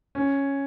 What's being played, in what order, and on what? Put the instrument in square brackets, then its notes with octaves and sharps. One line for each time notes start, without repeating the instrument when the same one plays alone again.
[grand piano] C#4